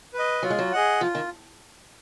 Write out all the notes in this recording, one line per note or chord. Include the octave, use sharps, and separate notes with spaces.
B4
D#5
F#3 F4
G#3
F#3
G#4 D#5 F#5
F3 F4
D#3